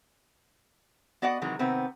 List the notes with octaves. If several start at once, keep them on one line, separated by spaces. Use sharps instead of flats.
B3 F#4 D5 D#5 F#5
C3 D#3 E3 F#3 G#3
C3 D#3 B3 C4